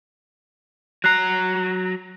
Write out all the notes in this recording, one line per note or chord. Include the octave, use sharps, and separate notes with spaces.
F#3 A#5 F#6 C7